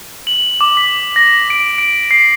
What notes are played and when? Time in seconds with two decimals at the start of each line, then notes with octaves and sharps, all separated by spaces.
0.27 F#7
0.61 D6
0.77 B6
1.16 A#6
1.50 D7
1.78 D7
2.11 C7